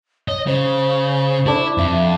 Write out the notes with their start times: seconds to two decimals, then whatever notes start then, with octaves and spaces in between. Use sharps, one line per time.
0.28 C#5 D#5
0.47 C#3 C5
1.46 D4 E4 A4 C#6
1.78 F2 E5